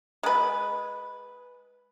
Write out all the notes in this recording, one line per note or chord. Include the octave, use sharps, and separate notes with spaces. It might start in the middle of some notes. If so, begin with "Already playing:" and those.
G#3 B4